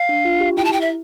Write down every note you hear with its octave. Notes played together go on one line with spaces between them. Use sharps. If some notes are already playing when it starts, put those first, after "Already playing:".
Already playing: F5
D4
F4
G4
E4 G5
A5
G5
E5